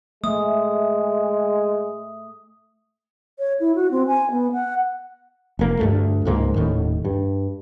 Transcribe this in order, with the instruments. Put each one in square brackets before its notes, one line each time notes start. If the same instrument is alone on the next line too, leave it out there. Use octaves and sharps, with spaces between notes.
[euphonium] G#3 [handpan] A3 [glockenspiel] D#6
[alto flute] C#5
E4
F#4
C4
G#5
B3
F#5
[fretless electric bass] F1 A#3
D2 G2 G#3 A3
C#2 G#2 G3 A#3
D#1 A2 D#3
G2